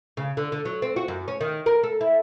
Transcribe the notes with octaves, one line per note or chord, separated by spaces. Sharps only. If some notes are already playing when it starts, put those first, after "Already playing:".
C#3
D3
D3
F#3
C4
F#4
F#2
C#4
D#3
A#4
A4
E4